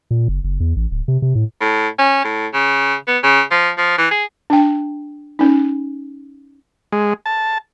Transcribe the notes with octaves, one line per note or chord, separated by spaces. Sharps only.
A#2
F#1
F#1
E2
A1
D1
C3
C3
A2
A2
C#4
A2
C#3
B3
C#3
F3
F3
E3
G#4
D4 G5
C#4 D#4
G#3
A5